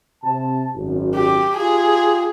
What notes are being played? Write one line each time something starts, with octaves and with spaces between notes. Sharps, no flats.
C3 A5
G#1 F#2
G4
F4 G4 G#4